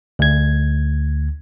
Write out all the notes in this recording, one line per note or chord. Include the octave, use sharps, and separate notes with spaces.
D2 G#6